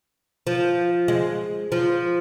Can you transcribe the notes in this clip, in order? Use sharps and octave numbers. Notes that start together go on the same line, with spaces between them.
F3
G#3
F3